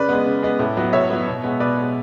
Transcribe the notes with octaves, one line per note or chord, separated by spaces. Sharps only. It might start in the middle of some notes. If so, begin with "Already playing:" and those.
Already playing: C#3 B4 D5
G#3 B3
C#3
G#3 B3
A2
F#3 B3
A2 C#5 E5
F#3 B3
B2
G#3 B3
B2 B4 D5
G#3 B3